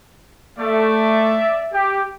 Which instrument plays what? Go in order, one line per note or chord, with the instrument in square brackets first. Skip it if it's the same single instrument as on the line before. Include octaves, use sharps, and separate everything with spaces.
[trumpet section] A3 [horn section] D5 E5
[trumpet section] G4